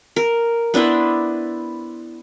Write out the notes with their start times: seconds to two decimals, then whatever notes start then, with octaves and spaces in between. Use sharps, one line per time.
0.16 A#4
0.74 B3 D4 E4 C5